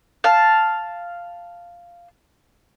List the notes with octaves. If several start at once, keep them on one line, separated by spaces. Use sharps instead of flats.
F5 A5